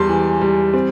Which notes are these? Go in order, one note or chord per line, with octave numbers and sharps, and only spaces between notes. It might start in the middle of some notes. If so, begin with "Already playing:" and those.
Already playing: E2 G3 A5 C6
E3
G3
C4